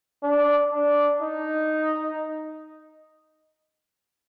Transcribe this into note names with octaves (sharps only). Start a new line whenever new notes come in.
D4
D4
D#4